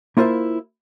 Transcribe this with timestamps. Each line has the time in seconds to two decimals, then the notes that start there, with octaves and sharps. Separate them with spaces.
0.17 A#3 E4 F4 A#4 C5 E5